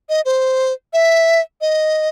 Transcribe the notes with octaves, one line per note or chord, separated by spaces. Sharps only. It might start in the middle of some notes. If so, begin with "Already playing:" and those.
D#5
C5
E5
D#5